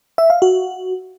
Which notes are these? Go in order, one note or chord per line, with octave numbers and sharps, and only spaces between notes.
E5
F5
F#4